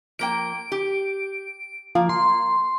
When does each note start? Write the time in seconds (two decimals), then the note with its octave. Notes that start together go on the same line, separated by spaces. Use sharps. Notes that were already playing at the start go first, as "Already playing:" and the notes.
0.19 F3 A#3 G5 D7
0.72 G4
1.95 F3 A#3
2.09 C6